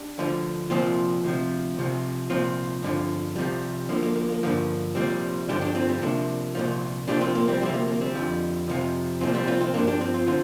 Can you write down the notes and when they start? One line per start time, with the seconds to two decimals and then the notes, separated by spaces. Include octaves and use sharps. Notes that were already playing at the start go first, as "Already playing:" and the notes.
Already playing: D4 G4
0.18 D2 D3 F3
0.70 C2 A#2 F3 C4 F4
1.23 D2 C3 F3
1.77 C2 C3 F3
2.30 C2 A#2 F3 C4 F4
2.83 G2 D3 F3
3.36 C2 C3 F3 G3
3.89 D2 D3 F3 A#3
4.03 A#3
4.16 A#3
4.29 A#3
4.43 G2 D3 F3 A#3
4.95 C2 A#2 F3 G3 C4
5.49 G2 D3 F3 D4 G4
5.61 D4 G4
5.75 C4 F4
5.89 G3 C4
6.01 C2 C3 F3 A#3 D4
6.55 C2 A#2 F3
7.08 C2 A#2 F3 D4 G4
7.21 C4 F4
7.35 A#3
7.48 G3 C4
7.61 D2 C3 F3 G3 C4
7.74 A#3
7.88 A#3
8.01 G3 C4
8.15 F2 D3 F3
8.68 F2 C3 F3
9.21 C2 A#2 F3 C4 F4
9.34 G3 C4
9.47 C4 F4
9.61 C4 F4
9.74 G2 F3 A#3 D4
9.87 D4 G4
10.01 C4 F4
10.14 C4 F4
10.27 D3 F3 C4 F4